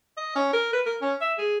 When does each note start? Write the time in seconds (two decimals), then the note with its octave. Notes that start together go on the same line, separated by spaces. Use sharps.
0.17 D#5
0.35 C#4
0.53 A#4
0.73 B4
0.86 A#4
1.02 C#4
1.21 E5
1.38 G#4